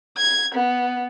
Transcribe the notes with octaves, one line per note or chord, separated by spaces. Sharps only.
G#6
B3